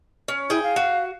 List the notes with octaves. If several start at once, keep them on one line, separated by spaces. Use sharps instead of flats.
C#4
E4 G#4 G5
F5
F#4